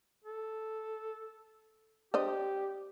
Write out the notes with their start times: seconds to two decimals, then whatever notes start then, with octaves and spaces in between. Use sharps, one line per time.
0.24 A4
2.14 D4 G4 C5 D#5